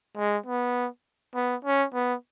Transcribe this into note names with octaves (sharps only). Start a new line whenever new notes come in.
G#3
B3
B3
C#4
B3